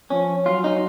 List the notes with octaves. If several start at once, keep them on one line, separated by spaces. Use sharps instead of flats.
F3 C#4
F#3 F4
D#4